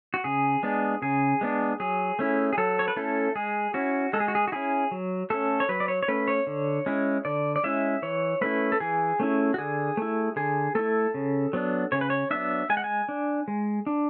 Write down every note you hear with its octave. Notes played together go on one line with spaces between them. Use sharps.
F#4
C#3 G#4
G#3 B3 D4
C#3 G#4
G#3 B3 D4
F#3 G#4
A3 C#4 E4
G#4
F#3 A4
C#5
B4
A3 C#4 E4 A4
G#3 G#4
C#4 E4 F#4
G#3 A4
G#4
F#4
G#4
F#4
C#4 E4 G#4
F#3
A3 C#4 A4
C#5
F#3 B4
D5
C#5
C#5
A3 C#4 B4
C#5
D3
G#3 C#4 E4
D3 D5
D5
G#3 C#4 E4 E5
E3 C#5
A3 C#4 E4 B4
A4
E3 G#4
A3 C#4 E4
F#4
D3 G#4
A3 E4
D3 G#4
A3 E4 A4
C#3
F#3 B3 D4
C#3 C#5
B4
C#5
F#3 B3 D4 E5
G#3 G#5
F#5
G#5
D4
G#3
D4